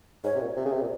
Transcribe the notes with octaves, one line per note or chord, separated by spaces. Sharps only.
G#2 C#5
C3
A#2
C3
C#3
C3
A#2